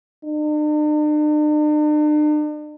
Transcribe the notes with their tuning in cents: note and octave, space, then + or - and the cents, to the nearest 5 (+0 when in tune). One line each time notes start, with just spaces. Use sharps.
D4 +45